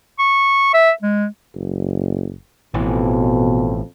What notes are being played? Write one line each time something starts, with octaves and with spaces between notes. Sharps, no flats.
C#6
E5
G#3
F#1
A1 F2 B2 E3